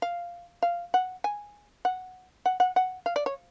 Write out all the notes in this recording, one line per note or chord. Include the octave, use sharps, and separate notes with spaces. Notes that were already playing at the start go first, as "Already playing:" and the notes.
F5
F5
F#5
G#5
F#5
F#5
F#5
F#5
F5
D5
C#5